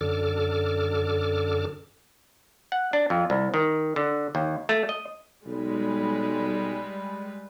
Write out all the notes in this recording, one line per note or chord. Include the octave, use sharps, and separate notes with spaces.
F#2 D3 A4 D6 F6
F#5
D4
F2
C2
D#3
D3
D#2
A3
D#5
B1 G3 G#3 B4